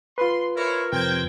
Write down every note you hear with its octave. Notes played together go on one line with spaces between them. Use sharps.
F4 B4 C6
E4 A#4 C5 C#5
F2 C3 C4 G5 G#6